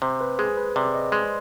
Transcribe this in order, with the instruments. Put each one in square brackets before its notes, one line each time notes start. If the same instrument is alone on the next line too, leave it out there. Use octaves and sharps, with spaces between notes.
[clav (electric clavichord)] C3 [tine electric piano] C5
[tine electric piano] B4
[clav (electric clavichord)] G#3 [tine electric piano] G#4
[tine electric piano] B4
[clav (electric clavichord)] C3 [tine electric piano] D5
[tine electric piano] D#5
[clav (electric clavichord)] G#3 [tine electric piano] C6